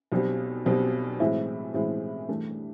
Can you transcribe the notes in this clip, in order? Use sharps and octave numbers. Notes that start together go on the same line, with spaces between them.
B1 B2 G3 C4
B1 B2 G3 C4
A2 E3 G#3 C4 E4
A2 E3 G#3 C4 E4
G2 E3 A3